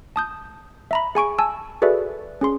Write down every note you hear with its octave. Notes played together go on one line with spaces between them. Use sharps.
A5 D#6 G6
E5 A#5 B5
G#4 G#5 C#6 D7
G#5 A5 E6
F#4 G#4 A4 B4 D5 E5
C#4 G#4 C6